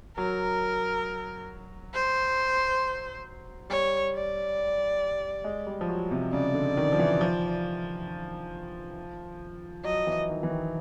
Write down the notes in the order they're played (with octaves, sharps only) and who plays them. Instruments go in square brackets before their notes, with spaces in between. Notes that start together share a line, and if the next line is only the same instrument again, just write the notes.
[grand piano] F#3 [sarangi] A#4
[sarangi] C5
[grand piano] G3 [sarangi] C#5
[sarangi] D5
[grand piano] G#3
G3
F3
F#3
C3
[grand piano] C#3 [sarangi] D5
[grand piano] D3
D#3
F3
E3
F3
[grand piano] F#3 [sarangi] D#5
[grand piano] E3
D#3
E3
D#3